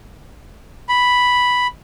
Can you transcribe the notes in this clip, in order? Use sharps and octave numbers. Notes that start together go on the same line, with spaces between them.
B5